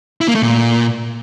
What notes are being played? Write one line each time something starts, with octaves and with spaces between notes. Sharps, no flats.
E4
A#3
A3
A#2